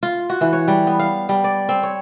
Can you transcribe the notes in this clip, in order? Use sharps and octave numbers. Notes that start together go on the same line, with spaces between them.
F4
F#4
E3
C#5
G3
B3
F5
G3
D5
C4
C#5